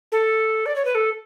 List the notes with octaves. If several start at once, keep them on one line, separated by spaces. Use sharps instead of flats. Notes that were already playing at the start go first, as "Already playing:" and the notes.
A4
D5
C#5
B4
A4